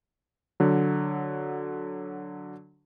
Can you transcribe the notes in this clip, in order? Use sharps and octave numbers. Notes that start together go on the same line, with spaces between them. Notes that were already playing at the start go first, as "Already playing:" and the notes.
D3 F#3